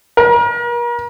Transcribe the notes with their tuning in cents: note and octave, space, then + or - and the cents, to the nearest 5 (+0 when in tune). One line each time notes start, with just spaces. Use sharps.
A#4 +40